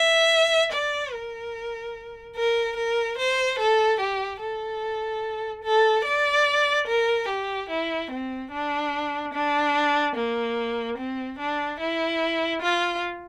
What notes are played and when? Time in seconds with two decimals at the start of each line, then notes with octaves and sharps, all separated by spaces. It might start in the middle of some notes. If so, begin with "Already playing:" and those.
Already playing: E5
0.72 D5
1.12 A#4
2.36 A#4
2.77 A#4
3.18 C5
3.59 A4
4.00 G4
4.41 A4
5.64 A4
6.05 D5
6.87 A#4
7.28 G4
7.69 E4
8.10 C4
8.52 D4
9.33 D4
10.16 A#3
10.98 C4
11.39 D4
11.79 E4
12.62 F4